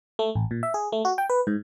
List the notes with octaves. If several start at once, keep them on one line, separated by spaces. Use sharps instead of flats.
A3
A1
A#2
E5
G#4
A3
F#4
G5
B4
G#2